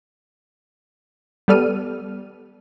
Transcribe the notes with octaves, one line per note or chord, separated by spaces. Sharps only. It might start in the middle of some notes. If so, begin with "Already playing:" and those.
G3 B3 A4 D5 F6 D#7